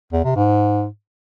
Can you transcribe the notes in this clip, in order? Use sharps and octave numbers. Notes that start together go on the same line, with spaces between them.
E2
C3
G#2